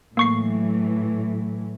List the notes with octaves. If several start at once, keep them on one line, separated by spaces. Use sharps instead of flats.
A2 E3 F#3 A#3 C#6 C7